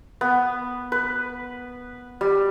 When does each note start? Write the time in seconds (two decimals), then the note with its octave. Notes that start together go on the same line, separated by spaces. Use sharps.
0.21 B3
0.92 B4
2.21 G3